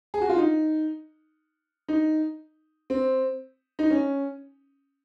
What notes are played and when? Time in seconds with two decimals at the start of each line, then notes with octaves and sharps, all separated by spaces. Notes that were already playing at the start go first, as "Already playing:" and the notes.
0.14 G#4
0.22 F#4
0.29 F4
0.38 D#4
1.88 D#4
2.90 C4
3.79 D#4
3.90 C#4